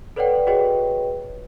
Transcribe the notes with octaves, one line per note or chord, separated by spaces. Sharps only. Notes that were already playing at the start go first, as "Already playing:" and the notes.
A4 B4 C#5 D5 F#5 G5
F#4 G#4 B4 C#5 D#5 G5